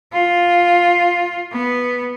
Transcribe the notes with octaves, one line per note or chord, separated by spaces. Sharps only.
F4
B3